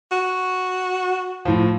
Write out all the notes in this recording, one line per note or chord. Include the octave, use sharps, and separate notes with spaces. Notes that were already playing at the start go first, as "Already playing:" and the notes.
F#4
A2 F3